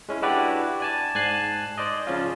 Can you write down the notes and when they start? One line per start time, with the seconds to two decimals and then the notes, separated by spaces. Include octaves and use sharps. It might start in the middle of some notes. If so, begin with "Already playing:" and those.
0.09 G#3 C#4 E4
0.22 D4 E4 F#4 G4 B4 D5
0.80 D5 G#5 A5
1.15 G#2 G#5 A5 F#6 C7
1.78 C5 D5 D#5
2.07 C#3 F3 C#4 F4